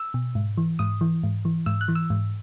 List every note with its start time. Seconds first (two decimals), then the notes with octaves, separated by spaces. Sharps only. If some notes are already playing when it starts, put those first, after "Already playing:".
Already playing: E6
0.14 B2
0.35 G#2
0.58 E3
0.79 G#2 D#6
1.01 E3
1.23 G#2
1.45 E3
1.66 G#2 E6
1.81 F#6
1.88 E3
1.95 E6
2.10 G#2